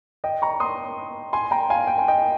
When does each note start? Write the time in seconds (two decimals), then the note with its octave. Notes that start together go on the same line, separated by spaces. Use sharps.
0.24 D#5 G5
0.42 A#5 C#6
0.60 C6 D#6
1.33 G#5 C6
1.51 G5 A#5
1.70 F5 G#5
1.87 G5
1.98 G#5
2.08 D#5 G5